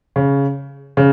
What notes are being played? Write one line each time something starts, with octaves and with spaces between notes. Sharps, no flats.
C#3
C#3